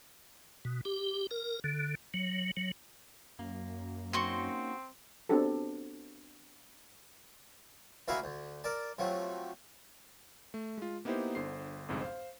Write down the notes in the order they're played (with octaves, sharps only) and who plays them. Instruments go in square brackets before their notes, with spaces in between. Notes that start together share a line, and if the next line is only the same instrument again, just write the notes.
[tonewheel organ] B2
G4
A#4
D3
F#3
F#3
[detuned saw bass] F#2 [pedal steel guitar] A#3
[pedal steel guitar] A#3 C#4 D#4 [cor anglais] C4 [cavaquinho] F#4 C6 C#6
[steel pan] B3 C4 D4 F#4 G4 A4
[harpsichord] D2 A#3 E4 F#4 F5 G#5
D2
A#4 D5 A5
C3 F3 F#3 A3
[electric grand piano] A3
G#3 F4
A#3 B3 D#4 E4 G4 C5
G1 D3 C5 C7
G1 C2 F2 G#2
C5 F5